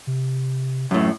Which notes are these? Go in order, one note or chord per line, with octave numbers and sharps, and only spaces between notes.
C3
F#2 A2